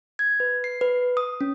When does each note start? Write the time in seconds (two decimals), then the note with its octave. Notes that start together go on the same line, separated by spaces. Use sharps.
0.19 G#6
0.40 B4
0.64 C7
0.81 B4
1.17 D#6
1.41 C#4